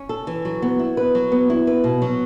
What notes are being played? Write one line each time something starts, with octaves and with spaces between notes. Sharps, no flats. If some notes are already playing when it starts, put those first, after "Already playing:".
Already playing: C#4
A4
E3
F#3
B3
E4
B4
F#3
B3
E4
B4
B2
F#3